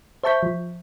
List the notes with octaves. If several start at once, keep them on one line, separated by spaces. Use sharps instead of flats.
C5 E5 A5 C#6 G6 B6
F3